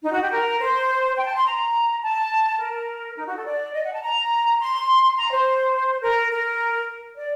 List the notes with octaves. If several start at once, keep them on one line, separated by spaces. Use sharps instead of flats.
D#4
F#4
G4
A#4
C5
G5
A5
C6
A#5
A5
A#4
D#4
F#4
A4
D5
D#5
F#5
A5
A#5
C6
A#5
C5
A#4
A#4
D5